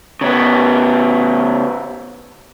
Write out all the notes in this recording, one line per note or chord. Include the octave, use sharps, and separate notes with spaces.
C#3 B3